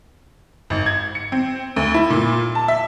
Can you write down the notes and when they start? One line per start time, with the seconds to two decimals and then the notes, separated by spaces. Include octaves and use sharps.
0.70 G#1
0.86 G#6
1.15 C#7
1.32 C4
1.76 D2
1.94 E4
2.10 A#2
2.55 A5
2.68 E5